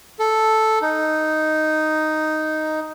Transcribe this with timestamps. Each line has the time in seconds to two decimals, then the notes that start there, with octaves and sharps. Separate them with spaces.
0.19 A4
0.82 D#4